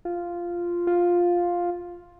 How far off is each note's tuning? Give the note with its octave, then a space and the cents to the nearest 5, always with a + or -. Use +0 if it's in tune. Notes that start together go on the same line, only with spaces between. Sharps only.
F4 -5
F4 +5